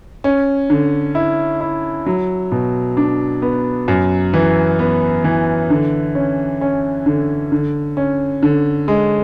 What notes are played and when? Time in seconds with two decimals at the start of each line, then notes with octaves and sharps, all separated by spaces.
0.24 C#4
0.70 D3
1.15 E4
1.61 E4
2.06 F#3
2.52 B2
2.97 D4
3.42 B3
3.88 F#2
4.34 E3
4.79 B3
5.24 E3
5.70 D3
6.15 C#4
6.61 C#4
7.06 D3
7.52 D3
7.97 C#4
8.43 D3
8.88 G#3